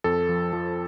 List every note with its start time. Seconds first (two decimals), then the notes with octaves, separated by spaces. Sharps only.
0.04 F2 A4
0.29 F3
0.53 F3